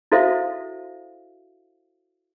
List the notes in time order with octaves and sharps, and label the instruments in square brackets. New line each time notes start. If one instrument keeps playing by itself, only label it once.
[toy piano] E4 F#4 A4 C5 E5 F5